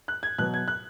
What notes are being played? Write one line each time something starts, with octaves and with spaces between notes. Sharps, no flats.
F#6
G#6
B2 F#3 B3 F#6
G#6
F#6